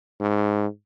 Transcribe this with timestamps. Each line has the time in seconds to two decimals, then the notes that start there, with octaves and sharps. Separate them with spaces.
0.21 G#2